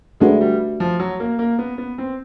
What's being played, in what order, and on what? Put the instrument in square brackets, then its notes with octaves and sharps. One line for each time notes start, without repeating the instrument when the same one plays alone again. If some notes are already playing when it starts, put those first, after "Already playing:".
[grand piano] G#3 [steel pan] A3 D4 F#4 B4
[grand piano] G3
F3
F#3
A#3
A#3
B3
B3
C4